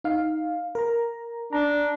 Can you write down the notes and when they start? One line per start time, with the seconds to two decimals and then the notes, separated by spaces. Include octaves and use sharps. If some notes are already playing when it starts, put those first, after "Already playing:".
0.04 D#4 F5
0.75 A#4 A#5
1.53 D4 A#5